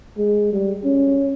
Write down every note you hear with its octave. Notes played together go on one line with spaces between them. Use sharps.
G#3
G3
C#4